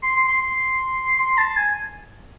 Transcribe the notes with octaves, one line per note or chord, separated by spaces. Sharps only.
C6
C6
C6
C6
C6
A5
G#5